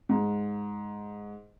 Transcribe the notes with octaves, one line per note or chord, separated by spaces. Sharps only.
G#2